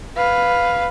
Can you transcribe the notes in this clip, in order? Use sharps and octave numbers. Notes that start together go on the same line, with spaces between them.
B4 F5